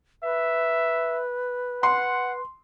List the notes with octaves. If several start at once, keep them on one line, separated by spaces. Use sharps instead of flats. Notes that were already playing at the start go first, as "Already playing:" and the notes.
B4 E5
F#5 C6